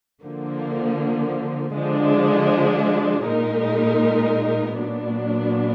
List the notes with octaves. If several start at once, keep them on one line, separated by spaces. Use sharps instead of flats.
D3 F3 A#3
D3 F3 G#3 D4
A#2 G#3 D#4 A#4
A#2 F#3 B3 D4